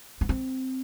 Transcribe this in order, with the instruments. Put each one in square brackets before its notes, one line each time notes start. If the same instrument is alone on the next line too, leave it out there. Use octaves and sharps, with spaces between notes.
[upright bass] B3
C4